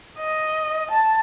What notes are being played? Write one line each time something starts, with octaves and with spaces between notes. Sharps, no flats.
D#5
A5